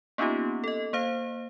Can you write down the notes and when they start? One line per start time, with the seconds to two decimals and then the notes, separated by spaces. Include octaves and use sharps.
0.18 A#3 B3 C#4 D#4 F4 G4
0.64 A4 D#5
0.93 A#3 C5 F5